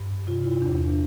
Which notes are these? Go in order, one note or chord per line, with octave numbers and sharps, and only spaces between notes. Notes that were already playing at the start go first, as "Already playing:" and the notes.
Already playing: G2
C3 F4
E4
E2 D4
D4